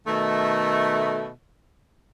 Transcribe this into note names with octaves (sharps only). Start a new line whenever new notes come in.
B2 D#3 A3